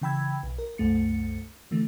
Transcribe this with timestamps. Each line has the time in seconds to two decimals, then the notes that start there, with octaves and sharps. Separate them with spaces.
0.02 C#3 E3 G5 B5 E6 G#6
0.43 B1
0.58 A#4
0.78 C2 F#2 A3 C#7
1.71 D3 E3 A3